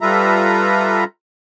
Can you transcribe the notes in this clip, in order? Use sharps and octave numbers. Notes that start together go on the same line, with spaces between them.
G3 F4 A4 B4 E5 A#5